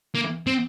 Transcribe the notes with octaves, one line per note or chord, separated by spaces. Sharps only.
A#3
C4